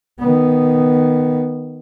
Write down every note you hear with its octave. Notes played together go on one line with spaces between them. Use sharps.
D#3 B3